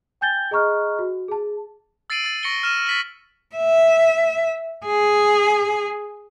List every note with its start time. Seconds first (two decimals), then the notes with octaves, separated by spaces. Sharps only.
0.21 G5 G#5 G6 A6 G7
0.51 G#4 D#5 A#5 C#6 F6 F#6
0.99 F#4
1.28 G#4 A5
2.10 E6 A6 C7 D7 D#7 F#7
2.24 E6 A6
2.43 C#6 A#6 C#7 D7 G7
2.63 F6 C7 D#7 E7
2.87 A6 B6 F#7
3.56 E5
4.86 G#4